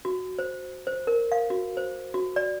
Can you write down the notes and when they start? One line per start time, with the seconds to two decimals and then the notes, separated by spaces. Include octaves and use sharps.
0.05 F#4
0.39 C5
0.87 C5
1.07 A#4
1.32 F5
1.50 F#4
1.77 C5
2.14 F#4
2.36 D5